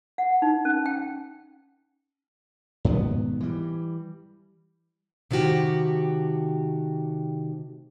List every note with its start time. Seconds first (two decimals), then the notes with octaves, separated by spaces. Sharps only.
0.18 F#5
0.42 D#4
0.65 C#4
0.86 G5
2.85 G#2 B2 D#3 B3
3.40 E3 G3
5.31 C3 D#3 A3 F#4 G4